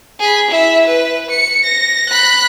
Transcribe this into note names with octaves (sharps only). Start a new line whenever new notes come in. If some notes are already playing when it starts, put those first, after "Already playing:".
G#4 B5
E4 E5
B4
C#7
A#6
B5 F#6